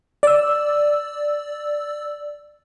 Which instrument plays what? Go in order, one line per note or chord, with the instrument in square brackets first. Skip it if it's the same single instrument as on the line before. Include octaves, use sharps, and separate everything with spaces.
[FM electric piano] D5 E6